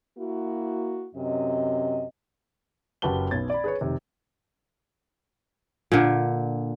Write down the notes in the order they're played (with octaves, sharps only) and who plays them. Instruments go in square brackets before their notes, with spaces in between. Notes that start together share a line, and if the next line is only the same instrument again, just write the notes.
[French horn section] A#3 E4 F#4
F#2 C3 D#5
[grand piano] F#1 F#4 G4 B4 A5 G7
B1 B3 G#6 A6
D5 B5
G#4 B4 C#5
F1 C3 D#3
[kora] A#2 D3